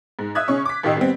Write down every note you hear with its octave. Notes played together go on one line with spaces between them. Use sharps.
G#2
E5 D#6 E6 F#6 G#6
C#3 C#4 C#6
D6 B6
A1 D#3 G4 D#5 E6
G3 B3 C4